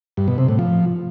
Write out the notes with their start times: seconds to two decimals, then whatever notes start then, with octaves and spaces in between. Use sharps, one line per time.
0.17 G2
0.28 B2
0.38 C3
0.48 A2
0.59 F3